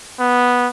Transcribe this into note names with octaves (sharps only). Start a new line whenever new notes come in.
B3